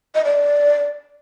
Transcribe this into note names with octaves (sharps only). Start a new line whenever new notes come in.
D#5
D5